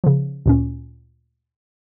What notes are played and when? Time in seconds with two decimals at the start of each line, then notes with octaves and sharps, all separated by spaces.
0.04 C#3 F3
0.46 D2 A#2 C#4